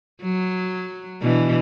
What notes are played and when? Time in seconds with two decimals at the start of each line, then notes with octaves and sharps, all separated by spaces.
0.22 F#3
1.22 B2 E3 D4